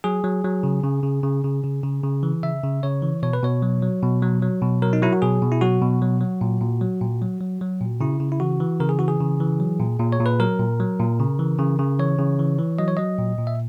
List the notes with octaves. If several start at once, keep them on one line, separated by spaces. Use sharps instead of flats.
F#3 G#4
F#3
F#3
C#3
C#3
C#3
C#3
C#3
C#3
C#3
C#3
E3
C#3 E5
C#3
C#3 C#5
E3
B2 C#5
B4
B2 C#5
F#3
F#3
B2
F#3
F#3
B2
F#3 A#4
D#4
F#3 E4
F#4
B2 G#4
B2
E4
F#3 F#4
B2
F#3
F#3
A#2
A#2
F#3
A#2
F#3
F#3
F#3
A#2
C#3 E4
C#3
E4
E3 F#4
E3
C#3 A#4
G#4
E3 F#4
G#4
C#3
E3
F#3
A#2
A#2
C#5
A#2
B4
F#3 A#4
A#2
F#3
A#2
C#3
E3
C#3
C#3
E3 C#5
C#3
E3
E3
F#3 D#5
C#5
F#3 D#5
A#2
A#2
E5